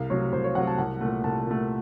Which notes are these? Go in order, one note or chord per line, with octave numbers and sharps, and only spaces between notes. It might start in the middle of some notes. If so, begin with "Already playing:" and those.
Already playing: C2 F5
C3 F#3 A3 C#5
C2 C5
C#5
C3 F#3 A3 F#5
A5
C2 F#5
A#2 A3
C2 A5
A#2 A3